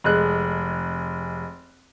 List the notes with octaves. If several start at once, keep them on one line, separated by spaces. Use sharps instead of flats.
F1 G#3 G#4 F#6